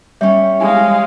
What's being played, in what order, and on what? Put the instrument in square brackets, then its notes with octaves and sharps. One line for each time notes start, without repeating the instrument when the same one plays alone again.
[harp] G3 C#4 [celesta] E5
[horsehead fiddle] G#3 F5 [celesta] G#5